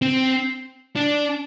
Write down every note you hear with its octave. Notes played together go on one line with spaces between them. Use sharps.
C4
D4